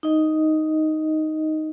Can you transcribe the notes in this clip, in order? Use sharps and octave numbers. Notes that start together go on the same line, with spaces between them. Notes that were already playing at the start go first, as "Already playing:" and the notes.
D#4 D#5